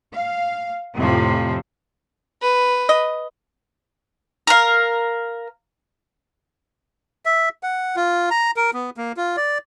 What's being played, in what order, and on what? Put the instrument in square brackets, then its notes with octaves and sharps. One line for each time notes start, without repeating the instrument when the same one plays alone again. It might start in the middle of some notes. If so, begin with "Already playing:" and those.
[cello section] F5
F2 A2 C3 F3
[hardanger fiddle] B4
[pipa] D#5
[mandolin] A#4 F5
[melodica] E5
F#5
F4
A#5
A#4
B3
A#3
F4
D5